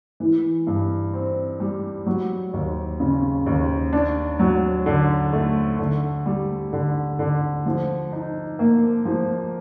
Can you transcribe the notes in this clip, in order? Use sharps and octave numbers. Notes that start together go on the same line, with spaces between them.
E3
G2
C4
G3
F#3
D#2
C#3
D#2
D4
F#3
D3
A3
D3
G3
D3
D3
F3
D#4
A#3
F3